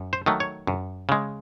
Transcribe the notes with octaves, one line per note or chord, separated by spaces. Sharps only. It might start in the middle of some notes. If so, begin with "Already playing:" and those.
Already playing: F#2
C5
D#3 F#3 A3
C#5
F#2
C#3 G#3